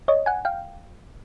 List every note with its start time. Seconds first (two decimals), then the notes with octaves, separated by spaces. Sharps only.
0.08 C#5 D#5
0.26 F#5 G#5
0.45 F5 G5